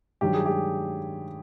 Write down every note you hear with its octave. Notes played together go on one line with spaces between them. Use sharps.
G2 D#3 F#3 G4
G#4
G4